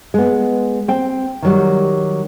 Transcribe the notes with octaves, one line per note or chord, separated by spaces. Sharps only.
G#3 B3
C4 G5
D#3 F#3 G3